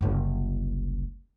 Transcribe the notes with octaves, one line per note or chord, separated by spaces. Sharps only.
F#1 C2